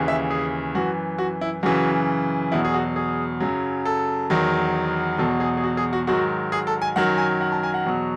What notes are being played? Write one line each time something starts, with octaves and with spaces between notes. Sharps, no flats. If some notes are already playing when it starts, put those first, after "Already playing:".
Already playing: D#2 C#3 E3
E5
G#4
F#2 E3 F#4
F#4
E4
F#2 C#3 E3 F#4
E2 B2 F#3 E4
G#4
F#4
G#4
F#2 C#3 F#3
A4
E2 D#3 F#3
E2 B2 F#3 A4
G#4
G#4
F#4
G#4
F#4
G#2 D#3 F#3 F#4
G#4
A4
G#5
F#2 D#3 F#3 F#5
G#5
F#5
A5
G#5
F#5
E2 B2 F#3